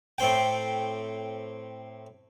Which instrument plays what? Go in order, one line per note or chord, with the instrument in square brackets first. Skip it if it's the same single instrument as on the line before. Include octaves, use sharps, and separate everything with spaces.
[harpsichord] A2 C4 G5